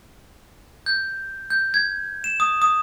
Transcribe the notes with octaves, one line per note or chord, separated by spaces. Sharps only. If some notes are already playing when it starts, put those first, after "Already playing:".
G6
G6
G#6
E7
D#6
D#6